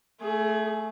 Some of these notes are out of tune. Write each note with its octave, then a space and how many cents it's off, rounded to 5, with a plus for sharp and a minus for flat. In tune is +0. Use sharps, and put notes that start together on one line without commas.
A3 +0 G#4 +25